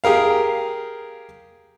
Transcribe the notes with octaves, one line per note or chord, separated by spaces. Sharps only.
G4 G#4 A#4 F5